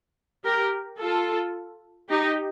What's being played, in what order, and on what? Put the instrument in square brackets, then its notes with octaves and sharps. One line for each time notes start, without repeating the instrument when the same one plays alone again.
[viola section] G4 A#4
F4 A4
D#4 G4